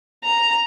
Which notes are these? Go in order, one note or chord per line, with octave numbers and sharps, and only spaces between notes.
A#5